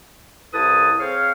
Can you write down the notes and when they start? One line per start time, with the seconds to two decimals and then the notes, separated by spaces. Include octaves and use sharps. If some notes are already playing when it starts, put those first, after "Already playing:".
0.54 C2 E4 A4 B4 A5 D#6
1.00 C4 G#4 C5 C#5 F5